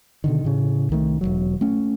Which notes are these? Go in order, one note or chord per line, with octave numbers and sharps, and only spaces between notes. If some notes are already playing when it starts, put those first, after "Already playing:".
B2 D3 D#3
A2 C#3
C2 D#3 A3
E1 B1 F#3
A3 C#4